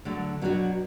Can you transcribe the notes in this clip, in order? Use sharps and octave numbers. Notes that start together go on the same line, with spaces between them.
D3 F#3 A3
B2 F#3 D4 F#4